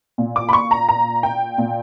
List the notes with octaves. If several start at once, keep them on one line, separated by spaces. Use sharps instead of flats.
A#2
D6
B5
C#6
A#5
A#5
G5
A#2